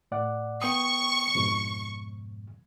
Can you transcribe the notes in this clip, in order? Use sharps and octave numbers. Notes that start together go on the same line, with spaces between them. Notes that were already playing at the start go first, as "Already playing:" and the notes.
A2 D5 F#5
B3 G5 C#6 D#6
F2 G#2 B2